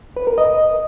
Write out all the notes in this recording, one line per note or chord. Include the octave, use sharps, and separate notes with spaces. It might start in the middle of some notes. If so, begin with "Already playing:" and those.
B4
A#4
D#5